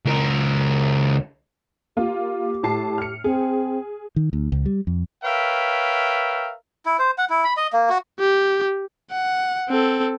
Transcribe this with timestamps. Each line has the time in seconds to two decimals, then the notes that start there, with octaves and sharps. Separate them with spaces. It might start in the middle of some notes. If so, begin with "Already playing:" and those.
0.05 C#2 A#4
1.97 A#3 F4 G4
2.63 A2 A5 C7
2.98 F6 C#7
3.24 C4 G#4
4.16 D#3
4.33 D2
4.52 C#2
4.66 G3
4.87 F2
5.24 A#4 B4 C#5 E5 F5 G5
6.86 E4
6.99 C5
7.18 F#5
7.30 E4
7.44 B5
7.57 D#5
7.73 A#3
7.90 F#4
8.19 G4
9.11 F#5
9.69 C4 A4